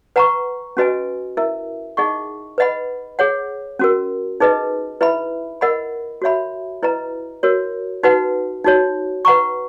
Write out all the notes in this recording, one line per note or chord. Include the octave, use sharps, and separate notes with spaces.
B4 F#5 A#5 C#6
C#4 F#4 B4 D#5 G#5
E4 A#4 E5
D#4 G#4 D#5 F#5 C#6
B4 D#5 F#5 B5
G#4 C#5 F#5
C#4 F#4 A#4
D#4 G#4 B4 D#5
E4 B4 E5 B5
A#4 D#5 F#5 B5
F#4 C#5 E5 B5
E4 B4 D#5 A#5
F#4 A#4 C#5
D#4 F#4 B4 F#5
D#4 F#4 C#5
B4 F#5 A#5 C#6